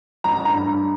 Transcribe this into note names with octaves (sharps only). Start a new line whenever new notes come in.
A1 A#5
G2 A#5
G2